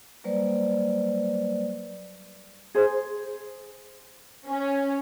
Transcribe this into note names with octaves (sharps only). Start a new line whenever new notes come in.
F#3 G3 A#3 B4 C5 D5
G#4 C5
C#4